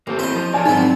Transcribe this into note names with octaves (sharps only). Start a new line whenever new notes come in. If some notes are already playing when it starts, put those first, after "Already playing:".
A1 A#3 C4 A4
C4 E4 B4 C5 D#5
F3 A5
A#4 C#5 D5 G#5 A5
F2 G#2 F#3 C4 D#4 B4